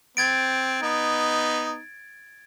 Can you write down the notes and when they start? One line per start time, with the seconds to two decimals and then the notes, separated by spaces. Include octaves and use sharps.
0.17 C4 G#6 A6 D7
0.82 B3 D#4